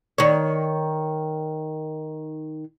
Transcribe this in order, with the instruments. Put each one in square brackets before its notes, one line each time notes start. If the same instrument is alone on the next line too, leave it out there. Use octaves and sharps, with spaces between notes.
[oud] D#3 C#5